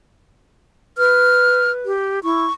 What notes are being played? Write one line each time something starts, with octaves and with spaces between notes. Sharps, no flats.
B4 F6
G4
E4 C#6